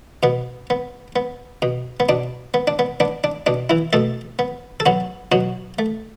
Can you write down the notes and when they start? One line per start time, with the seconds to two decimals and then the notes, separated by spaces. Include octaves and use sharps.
0.23 B2 B3
0.70 B3
1.16 B3
1.62 B2
2.00 B3
2.09 B2 D4
2.54 B3
2.67 D4
2.79 B3
3.00 B3 D4
3.24 D4
3.46 B2 D4
3.70 E3 E4
3.93 B2 A3 A4
4.39 B3
4.80 A4
4.86 F#3 B3 F#4
5.32 B2 F#3 F#4
5.79 A3